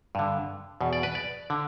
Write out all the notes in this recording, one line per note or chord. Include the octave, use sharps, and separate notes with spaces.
G2 D3
E2 B2
D5
B4
D5
D3